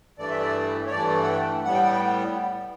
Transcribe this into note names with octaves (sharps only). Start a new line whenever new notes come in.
G2 E3 A3 D5
E5
D5
C#5
G2 E3 A3 D5
F#5
G5
A2 G3 B3 F#5
G5
F#5
G5